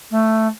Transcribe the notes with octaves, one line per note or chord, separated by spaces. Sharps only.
A3